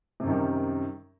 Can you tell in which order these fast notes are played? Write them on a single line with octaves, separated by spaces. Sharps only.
C3 F#2 D#3 G3